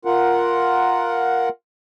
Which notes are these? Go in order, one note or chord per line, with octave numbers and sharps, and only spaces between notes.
F4 A#4 F#5